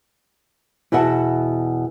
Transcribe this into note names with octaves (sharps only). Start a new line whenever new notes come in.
E2 B2 F#4 E5 F#5 A5